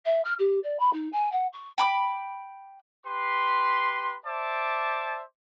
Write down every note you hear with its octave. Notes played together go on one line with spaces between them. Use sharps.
E5
F6
G4
D5
B5
D#4
G#5
F#5
C#6
G5 B5 D6
G4 B4 C6
C5 D5 E5 A5 D6